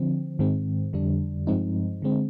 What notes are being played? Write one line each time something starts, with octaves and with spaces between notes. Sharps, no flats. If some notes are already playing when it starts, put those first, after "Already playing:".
Already playing: D3 F3 C4
G#2 D#3 G#3 C4
F2 D3 G3 D4
G2 F3 G#3 C4 D#4
D3 G#3 C4